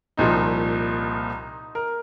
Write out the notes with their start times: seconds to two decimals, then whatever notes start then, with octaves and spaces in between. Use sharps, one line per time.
0.17 C2 A#2 F3 D#4
1.75 A#4